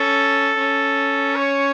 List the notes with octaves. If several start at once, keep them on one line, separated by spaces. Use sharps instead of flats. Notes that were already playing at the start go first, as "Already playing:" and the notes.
Already playing: C#4 A4
C#4
C#5